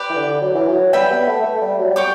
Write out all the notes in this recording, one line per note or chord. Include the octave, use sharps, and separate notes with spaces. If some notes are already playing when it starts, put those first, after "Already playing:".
Already playing: G4 B4 D5
E3
D3
F#3
E3
F#3
G3 B4 E5 G5 B5
B3
A3
A3
G3
F#3
G3
C#5 G5 D6